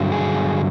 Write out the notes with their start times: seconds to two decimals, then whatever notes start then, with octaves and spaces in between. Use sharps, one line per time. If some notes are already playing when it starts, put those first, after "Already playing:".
Already playing: G2 D3 F#3
0.12 G#4